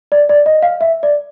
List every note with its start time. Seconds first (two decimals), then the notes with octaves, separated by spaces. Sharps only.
0.12 D5
0.29 D5
0.46 D#5
0.63 F5
0.81 E5
1.03 D5